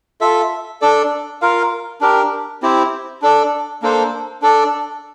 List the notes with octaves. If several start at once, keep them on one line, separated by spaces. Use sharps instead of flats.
F4 A4 E5
D4 A4 D5
F4 A#4 F5
D4 G4 A#4
C4 E4 G4 C5
D4 A4 D5
A#3 D4 A4 C5
D4 A4 D5